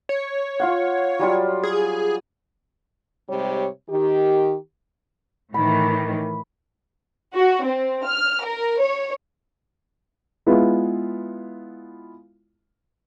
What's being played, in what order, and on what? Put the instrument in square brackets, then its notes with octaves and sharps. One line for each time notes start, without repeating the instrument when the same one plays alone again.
[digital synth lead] C#5
[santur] F4 F5 F#5
F#3 G3 F4
[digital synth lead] G#4
[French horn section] G#2 C3 G3 C#5
D#3 G4
[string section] A2 D#3 E3 [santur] B5
[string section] F#4
C4
F6
A#4
C#5
[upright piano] G#3 B3 E4 F4